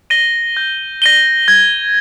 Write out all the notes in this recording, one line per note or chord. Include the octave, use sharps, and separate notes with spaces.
A#6 D#7 G7
G6
A#6 D#7 G7
G#6